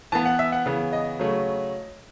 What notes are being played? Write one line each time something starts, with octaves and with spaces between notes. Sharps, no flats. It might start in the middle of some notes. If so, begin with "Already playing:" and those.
E3 B3 A5
F#5
E5
F#5
C#3 E3 B3
D#5
C#3 F#3 A3 C#4